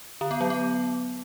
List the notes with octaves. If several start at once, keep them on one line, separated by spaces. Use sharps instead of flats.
D3
B3
F#3
B3